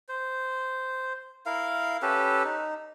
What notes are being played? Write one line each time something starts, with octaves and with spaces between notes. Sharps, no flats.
C5
E4 A#4 F5
C#4 G4 A4 B4
D#4